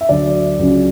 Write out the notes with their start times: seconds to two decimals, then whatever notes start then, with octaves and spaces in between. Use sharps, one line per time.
0.01 E5
0.09 D2 D3 F#3 D5
0.59 C#2 C#3 F#3 C#4